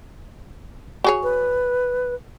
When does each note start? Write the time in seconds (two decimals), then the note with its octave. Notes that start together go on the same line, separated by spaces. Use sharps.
1.04 F#4 G#4 C#5
1.23 B4